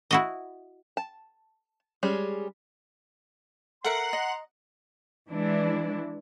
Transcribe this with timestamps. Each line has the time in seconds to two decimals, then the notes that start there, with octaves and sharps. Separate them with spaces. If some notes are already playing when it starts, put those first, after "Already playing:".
0.11 E4 F#4 D#5
0.97 A5
2.03 G3 G#3 C#4 G#4
3.84 A4 A#4 E5 F#5 A#5 C6
4.13 D#5
5.29 E3 G#3 D4 E4